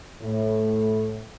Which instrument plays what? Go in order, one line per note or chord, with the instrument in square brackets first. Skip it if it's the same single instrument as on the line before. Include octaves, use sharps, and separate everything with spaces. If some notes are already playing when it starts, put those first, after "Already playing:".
[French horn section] A2